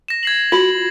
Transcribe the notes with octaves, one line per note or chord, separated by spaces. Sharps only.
A#6 E7
G#6 C7 F#7
F4 F#4 F#7